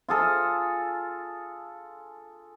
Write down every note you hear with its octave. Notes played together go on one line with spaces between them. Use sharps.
F4 G#4 A4